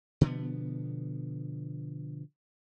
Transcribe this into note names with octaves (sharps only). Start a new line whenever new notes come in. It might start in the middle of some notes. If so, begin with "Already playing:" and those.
B2 D3 F3 B3